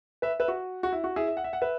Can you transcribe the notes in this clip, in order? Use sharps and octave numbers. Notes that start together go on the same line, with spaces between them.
B4 E5
B4 E5
F#4
F#4
E4
F#4
E4 G#4
E5
F#5
E5
F#5
B4 E5